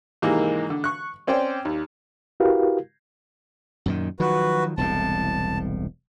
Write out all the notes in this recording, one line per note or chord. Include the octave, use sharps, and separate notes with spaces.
G#2 C3 D#3 E3 G#3 A#3
D3
C#6 F#6
C4 C#4 C5 D5 G5
D#2
E4 F#4 G4 A#4 B4 F5
F#2 A#2 D#3
D#3 F3 F#3 F#4 B4
E1 C2 A2 A5